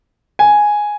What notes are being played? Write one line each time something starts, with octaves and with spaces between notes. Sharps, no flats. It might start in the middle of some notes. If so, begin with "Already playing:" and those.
G#5